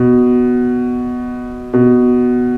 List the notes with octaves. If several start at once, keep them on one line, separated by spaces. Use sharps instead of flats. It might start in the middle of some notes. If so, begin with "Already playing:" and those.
Already playing: B2
B2